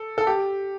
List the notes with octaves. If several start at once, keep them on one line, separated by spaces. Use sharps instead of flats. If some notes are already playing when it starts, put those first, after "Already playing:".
Already playing: A4
A4
G4